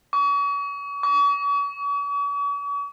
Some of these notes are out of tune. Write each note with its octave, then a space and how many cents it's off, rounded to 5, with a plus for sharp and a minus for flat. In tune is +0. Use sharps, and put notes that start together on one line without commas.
C#6 +40
C#6 +45